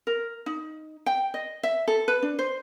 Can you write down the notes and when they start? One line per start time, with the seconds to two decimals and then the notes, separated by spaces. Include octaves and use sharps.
0.07 A#4
0.46 D#4
1.06 G5
1.34 D#5
1.63 E5
1.88 A4
2.08 B4
2.22 D4
2.39 C5